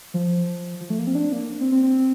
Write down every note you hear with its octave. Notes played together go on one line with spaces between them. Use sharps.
F3
F3
A3
A#3
C4
D4
A#3
C4
C4
C4